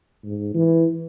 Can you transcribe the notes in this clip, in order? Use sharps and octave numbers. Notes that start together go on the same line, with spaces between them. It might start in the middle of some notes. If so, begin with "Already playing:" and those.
G#2
E3